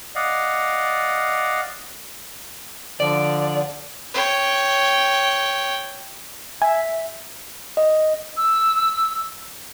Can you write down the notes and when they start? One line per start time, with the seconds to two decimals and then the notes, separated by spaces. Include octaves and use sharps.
0.15 D5 D#5 F5 F#5
3.00 D3 F3 D5
4.14 C#5 G5
6.62 E5 G#5
7.77 D#5
8.37 E6